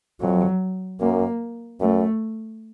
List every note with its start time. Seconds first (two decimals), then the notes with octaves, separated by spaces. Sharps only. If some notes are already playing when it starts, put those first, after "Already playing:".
0.20 F2 F#3
1.00 F#2 A#3
1.80 F#2 A3